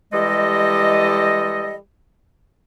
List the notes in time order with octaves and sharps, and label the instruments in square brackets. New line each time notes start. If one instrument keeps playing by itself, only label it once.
[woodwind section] E3 G3 G#3 G4 A4 D#5